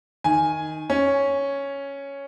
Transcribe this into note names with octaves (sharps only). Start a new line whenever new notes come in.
D#3 G#5
C#4